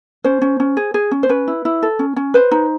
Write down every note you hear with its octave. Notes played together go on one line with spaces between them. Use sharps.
C#4 C5
C#4
C#4
G#4
G#4
C#4
C5
C#4 B4
E4
E4
A4
C#4
C#4
B4 C5
D#4